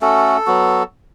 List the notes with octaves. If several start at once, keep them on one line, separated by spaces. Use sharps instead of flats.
A3 C#4 F#4 A4
F#3 B3 F#4